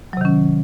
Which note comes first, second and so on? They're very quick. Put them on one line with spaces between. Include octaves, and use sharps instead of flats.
F#3 C3 D#3 C#4